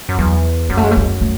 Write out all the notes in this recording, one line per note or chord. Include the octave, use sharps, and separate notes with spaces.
F#2
E2 F#3
F#2 G#3
A3
G#3
A3
G#3
A3